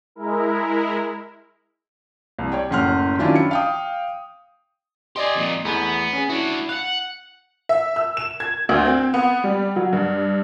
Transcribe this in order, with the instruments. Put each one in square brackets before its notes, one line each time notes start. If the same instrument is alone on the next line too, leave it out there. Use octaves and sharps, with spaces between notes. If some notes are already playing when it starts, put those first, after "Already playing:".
[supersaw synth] G#3 E4 A#4
[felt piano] C2
C#5 D5 G5
F#1 A2 F#5 C6 F6
D#3 F#3 C#4 D4 E4 F4
C#7
F5 G5 D#6
[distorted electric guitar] G4 G#5 [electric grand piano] D5 D#5 C6
[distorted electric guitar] F2 A#2
[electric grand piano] E2 A3 B5 [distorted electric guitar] B3
[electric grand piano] C#4 G#4
[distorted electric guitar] D4 F#4 [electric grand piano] E4
[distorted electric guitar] F5 F#5 [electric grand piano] F#6
[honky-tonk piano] E5
E6
E7
G#6
D2
C4
B3
G3
F#3
G2